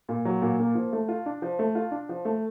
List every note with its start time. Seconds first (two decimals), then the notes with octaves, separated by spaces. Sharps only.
0.09 A#2
0.25 F#3
0.42 A#2
0.59 A#3
0.75 F3
0.93 A3
1.08 F4
1.26 D4
1.42 F3
1.59 A3
1.75 F4
1.91 D4
2.09 F3
2.25 A3